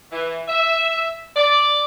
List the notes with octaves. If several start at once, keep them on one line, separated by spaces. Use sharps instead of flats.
E3
E5
D5